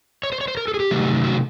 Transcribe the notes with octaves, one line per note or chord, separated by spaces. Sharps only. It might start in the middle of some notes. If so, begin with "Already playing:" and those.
C#5
C5
C#5
C5
A#4
A4
G#4
G4
C3 D#3 F#3 A3
F#4